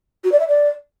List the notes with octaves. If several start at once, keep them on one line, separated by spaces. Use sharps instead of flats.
F#4
D5
E5
D5